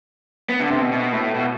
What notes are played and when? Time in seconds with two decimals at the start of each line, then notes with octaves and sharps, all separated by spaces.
0.49 B3
0.60 D3
0.70 C3
0.80 B2
0.92 B2
1.12 A2
1.34 B2